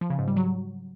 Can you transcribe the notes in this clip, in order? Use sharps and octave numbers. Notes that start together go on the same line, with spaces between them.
F3
C#3
G#2
G3
F#3